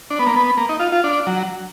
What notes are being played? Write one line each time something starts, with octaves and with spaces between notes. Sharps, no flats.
D4
B3
A#3
B3
A#3
D#4
F4
F4
D4
F#3